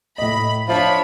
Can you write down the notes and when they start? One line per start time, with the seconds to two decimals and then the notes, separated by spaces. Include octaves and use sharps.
0.18 A2 D#5 B5
0.69 F3 D4 F4 C#5 E5 A5 B5